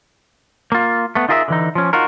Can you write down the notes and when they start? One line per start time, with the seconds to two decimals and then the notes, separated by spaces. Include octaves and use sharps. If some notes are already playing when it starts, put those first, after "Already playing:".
0.72 A#3 F4
1.15 A3 B3
1.29 D#4 F4 G#4 A#4 C#5 E5
1.48 D3 E3 D#4
1.75 F3 C#4
1.93 D#4 F4 F#4 A#4